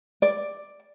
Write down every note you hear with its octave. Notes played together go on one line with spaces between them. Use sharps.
D5